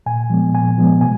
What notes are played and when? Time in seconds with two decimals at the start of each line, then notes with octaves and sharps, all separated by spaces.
0.06 A#2 G#5
0.30 F3 G#3 B3
0.53 A#2 G#5
0.78 F3 G#3 B3
1.01 B2 G#5